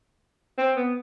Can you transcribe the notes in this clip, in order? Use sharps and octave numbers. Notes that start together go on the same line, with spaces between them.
C4
B3